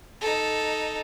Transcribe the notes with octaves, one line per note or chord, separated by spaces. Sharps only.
D#4 A4